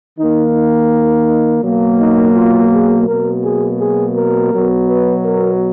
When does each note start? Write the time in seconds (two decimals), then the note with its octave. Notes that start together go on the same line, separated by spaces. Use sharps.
0.19 D#3 A#3 D#4
0.55 D#4
1.63 B2 F#3 A#3
2.00 D#4
2.35 F4
2.72 G#4
3.08 B2 F#3 A#3 A#4
3.44 G#4
3.80 G#4
4.16 A#4
4.52 B2 F#3 B3
4.88 B4
5.25 A#4